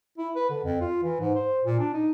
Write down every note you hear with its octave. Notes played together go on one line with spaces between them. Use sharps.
E4
B4
D3
F2
F4
E3
G#2
C5
A#2
D4
D#4